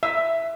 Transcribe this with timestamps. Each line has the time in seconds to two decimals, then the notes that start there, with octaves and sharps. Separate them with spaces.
0.03 E5